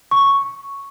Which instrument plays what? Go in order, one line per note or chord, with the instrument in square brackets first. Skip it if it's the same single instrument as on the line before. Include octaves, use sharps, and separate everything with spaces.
[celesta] C#6